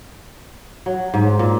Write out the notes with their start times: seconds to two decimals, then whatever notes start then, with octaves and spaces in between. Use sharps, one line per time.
0.86 F#3
1.14 G#2
1.39 A#2